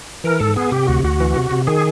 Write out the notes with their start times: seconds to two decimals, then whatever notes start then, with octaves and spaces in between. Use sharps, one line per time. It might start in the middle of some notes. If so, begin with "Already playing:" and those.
0.24 E3 A#4
0.40 G#2 A4
0.56 B3 G#4
0.72 C3 G4
0.87 D2 F#4
1.03 D2 F#4
1.20 E3
1.36 C3
1.51 C3
1.67 D#3 G#4